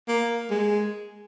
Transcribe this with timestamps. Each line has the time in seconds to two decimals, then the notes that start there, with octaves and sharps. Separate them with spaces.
0.08 A#3
0.51 G#3